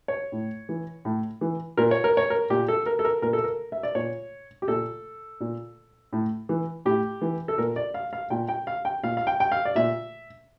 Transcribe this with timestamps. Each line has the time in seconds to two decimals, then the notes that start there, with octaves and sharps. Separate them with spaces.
0.08 C#5
0.32 A2
0.69 E3
1.05 A2
1.41 E3
1.77 A#2 A#4
1.91 C#5
2.04 A#4
2.17 C#5
2.30 A#4
2.50 A#2 G4
2.68 A4
2.86 A#4
2.99 A4
3.05 A#4
3.22 A#2 A#4
3.33 A4
3.44 A#4
3.72 E5
3.83 D5
3.95 A#2 C#5
4.62 G4
4.68 A#2 A4
5.41 A#2
6.13 A2
6.49 E3
6.85 A2 G4
7.22 E3
7.48 A4
7.58 A#2 A#4
7.76 D5
7.94 F5
8.13 F5
8.30 A#2 G5
8.49 G5
8.67 F5
8.85 G5
9.03 A#2 F5
9.17 F5
9.27 G5
9.40 G5
9.52 F5
9.65 D5
9.75 A#2 E5